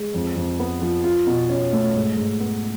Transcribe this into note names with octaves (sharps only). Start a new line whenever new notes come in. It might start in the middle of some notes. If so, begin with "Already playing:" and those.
Already playing: G#3
F2
F2
B3
F3
F4
B2
C#4
A3
G#2
G#2
B3